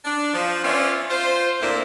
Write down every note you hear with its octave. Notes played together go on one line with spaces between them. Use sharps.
D4
F3
B3 C#4 F4 C5 D5 E5
F4 C5
D2 A#2 A#3 C4 D4 E4